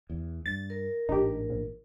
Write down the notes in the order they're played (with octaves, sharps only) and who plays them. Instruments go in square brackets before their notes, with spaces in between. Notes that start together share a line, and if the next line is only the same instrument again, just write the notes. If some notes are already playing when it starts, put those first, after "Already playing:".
[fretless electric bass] E2
[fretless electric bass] G2 [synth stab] A6
[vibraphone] A#4
[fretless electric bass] A1 G#2 D4 [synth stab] D#4 G4
[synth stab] A#1